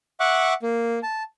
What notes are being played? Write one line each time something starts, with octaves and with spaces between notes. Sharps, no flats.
E5 F#5 C#6 D6 F#6
A#3
A5